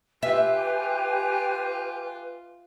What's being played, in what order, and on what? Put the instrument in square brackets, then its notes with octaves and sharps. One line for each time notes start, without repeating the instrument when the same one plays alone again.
[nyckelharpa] F4 [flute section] G4 G#5 [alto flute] B4 [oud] E5